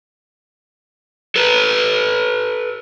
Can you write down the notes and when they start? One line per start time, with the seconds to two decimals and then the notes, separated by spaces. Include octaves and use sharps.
1.36 A4 B4